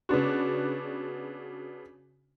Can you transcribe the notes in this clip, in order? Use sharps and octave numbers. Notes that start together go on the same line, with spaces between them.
C#3 B3 D4 F#4